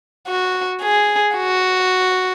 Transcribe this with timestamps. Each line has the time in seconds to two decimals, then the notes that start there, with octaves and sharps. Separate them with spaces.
0.27 F#4
0.82 G#4
1.36 F#4